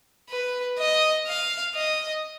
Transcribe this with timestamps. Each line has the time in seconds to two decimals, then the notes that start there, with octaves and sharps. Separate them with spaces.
0.30 B4
0.79 D#5
1.27 F5
1.75 D#5